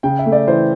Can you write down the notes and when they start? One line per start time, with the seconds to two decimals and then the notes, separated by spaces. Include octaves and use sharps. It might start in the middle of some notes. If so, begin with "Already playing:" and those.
0.03 C#3 G5
0.19 E5
0.26 A3
0.32 D5
0.47 E3 C5